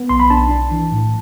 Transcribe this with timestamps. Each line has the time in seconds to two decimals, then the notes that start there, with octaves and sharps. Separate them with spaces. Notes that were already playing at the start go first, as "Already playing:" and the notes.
Already playing: B3
0.09 B1 C6
0.20 B5
0.30 D4 A5
0.51 D4
0.71 E3
0.92 A2